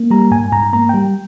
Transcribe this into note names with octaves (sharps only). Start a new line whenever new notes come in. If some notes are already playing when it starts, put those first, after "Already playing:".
Already playing: A#3
G3 A#5
G#2 G#5
G#2 A#5
A#3 A#5
G3 G5